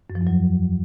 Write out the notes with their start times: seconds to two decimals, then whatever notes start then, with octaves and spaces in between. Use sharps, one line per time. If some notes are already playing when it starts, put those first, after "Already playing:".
0.10 F#2
0.15 F3
0.21 E2
0.27 F#3